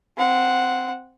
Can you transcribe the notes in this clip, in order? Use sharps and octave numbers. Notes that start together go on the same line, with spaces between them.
C4 F#5